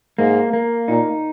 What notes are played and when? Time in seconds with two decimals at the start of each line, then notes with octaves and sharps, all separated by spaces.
0.19 G#2 A#3
0.53 A#3
0.88 A#2 D#4